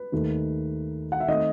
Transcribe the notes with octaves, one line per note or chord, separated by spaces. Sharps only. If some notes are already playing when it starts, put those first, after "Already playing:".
Already playing: B4
D#2 D#3 A3
F#5
E5
D#3 A3 C4 D#5